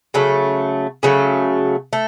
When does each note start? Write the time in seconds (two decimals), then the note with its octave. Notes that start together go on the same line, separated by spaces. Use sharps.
0.14 C#3 F#3 A3
1.03 C#3 F#3 A3
1.93 A3